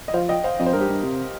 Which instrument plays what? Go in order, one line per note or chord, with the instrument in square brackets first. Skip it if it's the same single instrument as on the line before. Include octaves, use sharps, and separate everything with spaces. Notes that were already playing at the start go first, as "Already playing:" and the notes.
[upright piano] D#5
[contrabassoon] F3 [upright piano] C5 F5
[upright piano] D#5 G5
C5 F5
[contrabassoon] F2 [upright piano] D#5
[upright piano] C5
[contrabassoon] G2 [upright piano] A#4
[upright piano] G4 C5
[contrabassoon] G2
C3